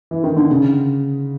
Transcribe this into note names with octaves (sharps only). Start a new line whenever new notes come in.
E3
D#3
D3
C#3